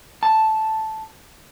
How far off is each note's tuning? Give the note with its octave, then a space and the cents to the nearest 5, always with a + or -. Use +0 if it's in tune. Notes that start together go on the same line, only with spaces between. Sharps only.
A5 -5